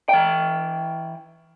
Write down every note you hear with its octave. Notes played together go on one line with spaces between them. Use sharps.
E3 G5